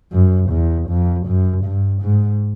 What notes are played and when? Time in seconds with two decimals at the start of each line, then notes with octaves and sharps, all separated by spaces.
0.12 F#2
0.51 E2
0.89 F2
1.27 F#2
1.65 G2
2.03 G#2